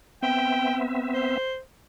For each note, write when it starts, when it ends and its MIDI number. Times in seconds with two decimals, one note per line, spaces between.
0.23 1.38 59
0.23 1.38 60
0.23 1.38 76
0.23 0.82 79
1.13 1.59 72